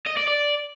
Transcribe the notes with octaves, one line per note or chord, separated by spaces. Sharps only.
D#5
D5
D5